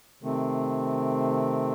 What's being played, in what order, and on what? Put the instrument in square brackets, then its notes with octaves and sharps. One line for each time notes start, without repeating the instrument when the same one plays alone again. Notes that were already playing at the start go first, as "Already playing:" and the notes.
[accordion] C3 D#3 A3 C4